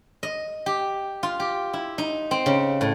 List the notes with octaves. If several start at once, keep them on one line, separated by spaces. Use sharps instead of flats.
D#5
G4
F4
G4
E4
D#4
C4
C#3
A2